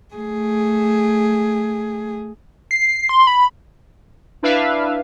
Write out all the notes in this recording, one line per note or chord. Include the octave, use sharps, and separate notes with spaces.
A3 G#4
C7
C6
B5
D4 E4 B4 E5 F5